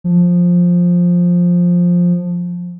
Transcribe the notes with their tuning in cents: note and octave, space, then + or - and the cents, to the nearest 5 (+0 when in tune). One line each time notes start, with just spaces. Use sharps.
F3 +10